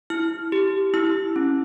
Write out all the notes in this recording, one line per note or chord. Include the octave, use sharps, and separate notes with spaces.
E4 F6
G4
E4 E6
C#4